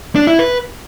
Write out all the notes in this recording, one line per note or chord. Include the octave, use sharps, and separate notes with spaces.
D4
E4
B4